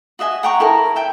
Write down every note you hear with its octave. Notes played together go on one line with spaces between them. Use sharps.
F#4 D#5 E5 G#5
F#5 G5 A#5 C#6
E4 A4 A#4
E5 G5 G#5